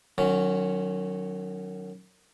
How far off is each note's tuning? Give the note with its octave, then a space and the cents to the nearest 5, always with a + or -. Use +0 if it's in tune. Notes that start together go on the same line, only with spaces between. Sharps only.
D#3 -30 F#3 +0 C#4 +0